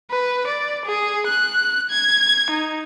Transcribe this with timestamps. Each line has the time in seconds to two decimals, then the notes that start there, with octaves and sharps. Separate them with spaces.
0.11 B4
0.47 D5
0.86 G#4
1.27 F#6
1.90 G#6
2.50 D#4